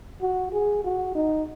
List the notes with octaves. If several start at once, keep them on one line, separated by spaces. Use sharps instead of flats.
F#4
G#4
F#4
D#4